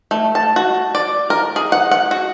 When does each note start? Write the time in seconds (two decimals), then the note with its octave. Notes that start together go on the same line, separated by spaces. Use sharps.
0.11 A3
0.35 A5
0.56 F#4
0.95 D5
1.30 A#4
1.56 G#4
1.72 F#5
1.91 F#5
2.11 F#4